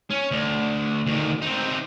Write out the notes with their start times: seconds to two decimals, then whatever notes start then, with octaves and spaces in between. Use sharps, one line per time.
0.11 C#4
0.31 D2
1.06 D2 D#3
1.42 C4 D#4